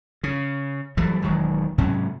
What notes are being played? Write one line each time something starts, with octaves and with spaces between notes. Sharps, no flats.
C#3
E3 F#3 G3 A3
E1 D#3 F#3 G#3
G#2 C3 F#3 C#4